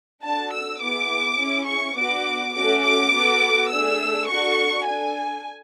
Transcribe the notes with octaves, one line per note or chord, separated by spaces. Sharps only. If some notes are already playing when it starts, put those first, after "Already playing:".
D4 F#4 A4 A5
E6
B3 E4 G#4 D6
C#4 E4 G#4
C#6
B3 D4 F#4 D6
A3 C#4 F#4 A4 D6
D6
B3 F#4 A4
A3 D4 G#4 E6
D4 F#4 A4 C#6
D4 A4 G#5